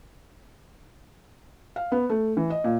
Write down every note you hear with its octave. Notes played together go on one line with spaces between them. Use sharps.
F5
B3
A3
E3
D#5
A#2